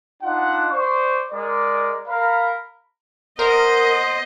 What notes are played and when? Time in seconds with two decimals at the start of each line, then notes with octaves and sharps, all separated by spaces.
0.22 D4 D#4 F4 F#5
0.71 C5 D5 C#6
1.32 G#3 A#4 D5
2.08 A#4 F5 B5
3.39 B3 A#4 C5 D#5